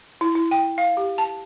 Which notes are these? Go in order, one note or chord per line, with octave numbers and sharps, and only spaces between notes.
E4
E4
G5
F5
G4
A5